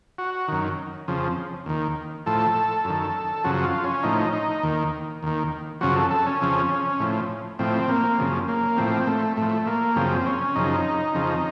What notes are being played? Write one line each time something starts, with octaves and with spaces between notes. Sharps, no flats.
F#4
F#2 D#3
F2 C#3 F3
D#2 D#3
A2 F3 A4
F#2
D#3
F#2 C#3 F3 F#4
F4
C#4
A2 F3 D#4
D#4
D#2 D#3
D#2 D#3
F#2 C#3 F3 F#4
A4
A4
C#4
F2 C#3 F3
A2 F3
A2 F3 C4
A#3
F#2 C#3 F3
A#3
A2 F3 C4
A3
A2 F3 A3
A#3
F#2 C#3 F3 C4
C#4
F#2 C#3 F3 D#4
F2 C#3 F3